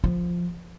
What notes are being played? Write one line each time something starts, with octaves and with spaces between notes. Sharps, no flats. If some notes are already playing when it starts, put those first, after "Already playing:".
F3